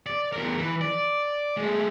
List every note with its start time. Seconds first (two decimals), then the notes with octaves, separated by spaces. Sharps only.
0.06 D5
0.32 E2 A#4
0.57 E3
0.81 D5
1.57 G#3 A3